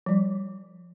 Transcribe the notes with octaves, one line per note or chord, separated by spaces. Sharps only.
F3 G3